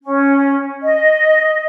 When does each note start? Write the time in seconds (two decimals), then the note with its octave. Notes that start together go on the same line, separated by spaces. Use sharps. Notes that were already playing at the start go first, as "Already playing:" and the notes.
0.02 C#4
0.82 D#5